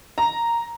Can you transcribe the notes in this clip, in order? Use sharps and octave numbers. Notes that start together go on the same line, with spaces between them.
A#5